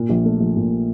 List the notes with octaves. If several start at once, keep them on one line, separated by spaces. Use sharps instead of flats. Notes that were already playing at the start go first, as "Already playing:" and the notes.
Already playing: A#2
A#1
A3
A#1
A#2